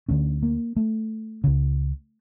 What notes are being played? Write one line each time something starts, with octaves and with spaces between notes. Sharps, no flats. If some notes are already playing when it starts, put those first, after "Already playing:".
D2 D3 C#4
A#3
A3
C#2 C#3